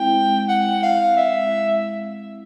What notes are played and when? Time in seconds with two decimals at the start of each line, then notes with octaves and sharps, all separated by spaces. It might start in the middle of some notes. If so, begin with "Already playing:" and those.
Already playing: G#3 C4 E4 G5
0.49 F#5
0.83 F5
1.17 E5